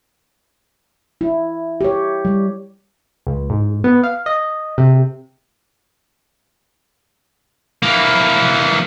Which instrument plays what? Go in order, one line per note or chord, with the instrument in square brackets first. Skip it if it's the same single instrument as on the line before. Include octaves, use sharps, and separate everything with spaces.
[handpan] E4
G4 C#5
G3
[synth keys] C#2
G#2
B3
F5
D#5
C3
[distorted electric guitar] E3 A#3